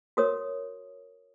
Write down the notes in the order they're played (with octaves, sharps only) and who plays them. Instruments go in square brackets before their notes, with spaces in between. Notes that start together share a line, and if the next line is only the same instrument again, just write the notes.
[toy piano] F#4 A#4 C#5 D#6